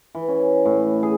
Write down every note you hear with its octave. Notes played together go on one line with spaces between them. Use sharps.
E3
C#4
A2
G#4